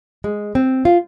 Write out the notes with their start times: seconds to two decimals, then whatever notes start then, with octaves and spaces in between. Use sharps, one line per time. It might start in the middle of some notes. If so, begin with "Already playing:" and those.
0.24 G#3
0.55 C4
0.85 F4